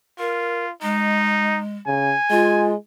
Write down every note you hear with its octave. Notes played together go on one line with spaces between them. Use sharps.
F4 A#4
G#3 D#4
C#3 G#5
G#3 F4